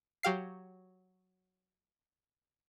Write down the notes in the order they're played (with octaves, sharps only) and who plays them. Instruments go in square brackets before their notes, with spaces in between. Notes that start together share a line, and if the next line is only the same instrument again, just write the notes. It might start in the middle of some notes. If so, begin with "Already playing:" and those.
[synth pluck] F#3 G4 F5 C7